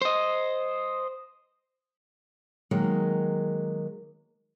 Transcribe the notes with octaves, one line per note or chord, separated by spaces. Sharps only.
C5 D#5
D#3 F#3 G#3 A#3